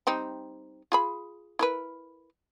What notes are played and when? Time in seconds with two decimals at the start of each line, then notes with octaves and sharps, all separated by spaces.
0.07 G3 C4 D#4
0.92 F4 G#4 B5
1.59 E4 A#4 B4